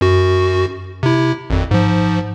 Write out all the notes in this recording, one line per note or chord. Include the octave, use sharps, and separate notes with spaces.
F#2 F#4
C3 E4
G#1 F2
G#2 F3